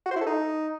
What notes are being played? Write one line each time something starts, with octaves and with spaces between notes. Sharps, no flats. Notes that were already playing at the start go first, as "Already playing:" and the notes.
F#4
C5
E4
A4
D#4